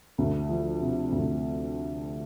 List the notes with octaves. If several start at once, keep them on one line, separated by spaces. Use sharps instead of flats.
D2
F3
C3
D2